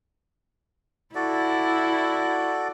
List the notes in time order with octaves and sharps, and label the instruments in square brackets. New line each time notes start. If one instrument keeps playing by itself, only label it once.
[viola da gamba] E4 [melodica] F#4 A4 D5